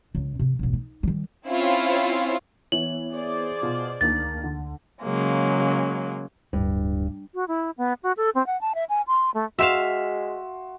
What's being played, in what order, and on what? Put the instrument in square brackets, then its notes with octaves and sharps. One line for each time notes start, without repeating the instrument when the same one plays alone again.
[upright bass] C#2
C3
E1 A1
D#4
D#3 G3
[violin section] C4 C#4 E4 F4 C#5
[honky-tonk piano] E3 [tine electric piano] B3 C#5 [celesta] F#7
[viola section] G#4 C5 D5
[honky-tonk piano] B2 F4
[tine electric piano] D2 [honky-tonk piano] D#3 A#3 D4 [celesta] A6
[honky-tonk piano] D3
[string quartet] C#3 F#3 G#3 A#3
[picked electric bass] D1 [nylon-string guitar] G2
[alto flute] F#4
E4
B3
F#4
A4
C4
F#5
A5
E5
G#5
C6
A3
[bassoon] G#3 [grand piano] F#4 C6 E7 [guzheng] E5 F5